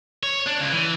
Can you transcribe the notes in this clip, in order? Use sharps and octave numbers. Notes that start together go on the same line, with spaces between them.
C#5
D4
C#2
E3